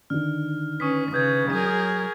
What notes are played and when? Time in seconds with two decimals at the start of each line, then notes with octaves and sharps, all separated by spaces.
0.10 D3 D#3 F6
0.80 C#4 B4 C#6 D#6 B6
1.13 C#3 B4 D#6 G6 G#6
1.52 F#3 G#4 A#4